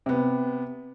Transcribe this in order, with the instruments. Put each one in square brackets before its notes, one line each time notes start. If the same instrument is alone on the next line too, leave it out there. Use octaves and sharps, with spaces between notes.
[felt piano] C3 B3